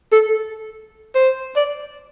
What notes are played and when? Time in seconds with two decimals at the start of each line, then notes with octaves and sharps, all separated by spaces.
0.12 A4
1.15 C5
1.57 D5